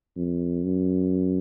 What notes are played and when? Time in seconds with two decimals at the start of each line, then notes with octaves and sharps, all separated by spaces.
0.17 F2
0.64 F#2